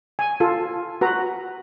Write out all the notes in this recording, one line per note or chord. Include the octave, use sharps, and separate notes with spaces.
G#5
F4 A4
F#4 B4 A#5